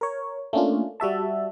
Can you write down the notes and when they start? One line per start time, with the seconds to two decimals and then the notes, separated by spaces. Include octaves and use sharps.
0.01 A#4 C#5
0.53 A3 A#3 C#4 D4 F4
1.00 G3 F#4 E5 A5